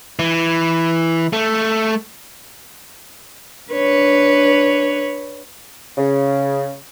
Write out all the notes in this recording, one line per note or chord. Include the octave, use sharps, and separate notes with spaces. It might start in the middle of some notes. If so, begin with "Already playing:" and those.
E3
A3
D4 B4 C#5
C#3